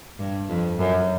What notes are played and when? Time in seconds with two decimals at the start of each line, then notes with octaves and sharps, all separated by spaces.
0.19 G2
0.50 F2
0.79 F#2